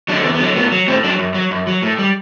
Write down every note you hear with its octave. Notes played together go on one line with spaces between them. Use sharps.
D3 F#3 D4
E2 B3
B3
D3 F#3
A2 B3
F#3
A2 C4
F#3 D4
F#2
F#3
F#2
F#3
A2
G3